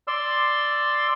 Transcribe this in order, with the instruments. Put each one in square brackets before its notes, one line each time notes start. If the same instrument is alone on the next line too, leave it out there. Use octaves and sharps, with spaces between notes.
[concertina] D5 C6 E6